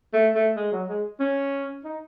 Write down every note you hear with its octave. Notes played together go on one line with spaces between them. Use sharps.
A3
A3
G#3
F#3
G#3
C#4
D#4